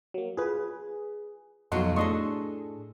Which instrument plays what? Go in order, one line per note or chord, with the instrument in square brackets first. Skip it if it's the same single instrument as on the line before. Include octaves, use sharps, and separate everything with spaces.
[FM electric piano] F#3 A#3
[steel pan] F4 B4 [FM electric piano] G#4
[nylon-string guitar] F2 B2 F#3 [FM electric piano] D#4 A4 F#5 [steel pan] F#4 C6
[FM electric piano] A2 [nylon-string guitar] D4 G#4 A4 [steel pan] D#5 C6 C#6